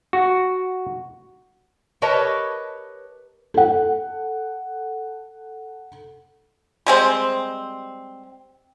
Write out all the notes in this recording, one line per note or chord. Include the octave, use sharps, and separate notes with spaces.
F#4
G4 A#4 B4 C#5 D#5 A5
A4 F#5
G3 G#3 C4